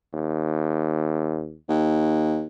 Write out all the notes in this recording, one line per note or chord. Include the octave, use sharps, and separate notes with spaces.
D#2
D#2